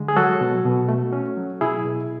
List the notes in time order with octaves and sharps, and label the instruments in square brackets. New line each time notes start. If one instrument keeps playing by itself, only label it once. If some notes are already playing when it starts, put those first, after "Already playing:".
Already playing: [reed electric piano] D3 G#3
G#4
F#3 F#4 A4
B2
B2
A3
C#4
F#3
B2 E4 G#4
B2